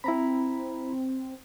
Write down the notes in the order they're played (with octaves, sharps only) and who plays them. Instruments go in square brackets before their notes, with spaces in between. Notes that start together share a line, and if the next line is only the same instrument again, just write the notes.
[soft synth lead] C4 [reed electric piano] E4 A#5 B5